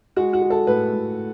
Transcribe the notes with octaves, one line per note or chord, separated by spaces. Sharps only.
G#3 F#4
F#4
G#3
A4
A2 B4
A2